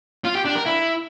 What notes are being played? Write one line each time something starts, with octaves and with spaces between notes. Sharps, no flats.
F4
G4
D4
A#4
E4